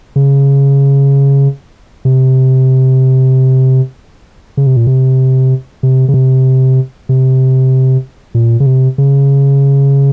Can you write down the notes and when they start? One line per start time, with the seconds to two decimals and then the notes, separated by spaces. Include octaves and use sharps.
0.16 C#3
2.05 C3
4.57 C#3
4.67 C3
4.77 A#2
4.87 C3
5.83 C3
6.08 C#3
6.14 C3
7.09 C3
8.35 A#2
8.60 C#3
8.66 C3
8.98 C#3